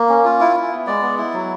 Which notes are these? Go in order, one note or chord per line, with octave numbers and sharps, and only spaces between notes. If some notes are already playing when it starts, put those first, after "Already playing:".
Already playing: A#3
C#4
F4
E4
E4
B3
G#3 D5
B3
E4
F#3